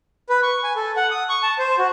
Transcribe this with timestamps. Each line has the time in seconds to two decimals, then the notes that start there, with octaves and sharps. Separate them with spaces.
0.29 B4
0.43 C#6
0.64 G#5
0.76 A4
0.97 F#5
1.11 D#6
1.29 C#6
1.43 A5
1.59 C5
1.78 F#4